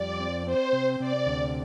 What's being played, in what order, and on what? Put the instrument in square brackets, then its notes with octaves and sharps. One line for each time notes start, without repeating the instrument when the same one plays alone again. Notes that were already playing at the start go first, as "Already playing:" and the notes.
Already playing: [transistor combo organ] F2 G3 [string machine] D5
[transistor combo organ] C4
[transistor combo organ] C4 [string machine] C5
[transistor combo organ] C3
[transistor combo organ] C3 [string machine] D5
[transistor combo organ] D2